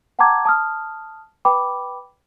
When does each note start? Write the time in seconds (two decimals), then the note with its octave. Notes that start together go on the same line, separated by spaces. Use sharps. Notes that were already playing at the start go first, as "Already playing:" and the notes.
0.19 F#5 G5 A5 A#5 D6 G#6
0.45 A5 D#6 F6
1.45 B4 G5 B5 D6